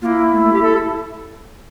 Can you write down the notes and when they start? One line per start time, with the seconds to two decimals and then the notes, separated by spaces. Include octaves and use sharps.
0.02 A#3 E4 F4
0.32 A3
0.43 A3
0.53 G4
0.62 A4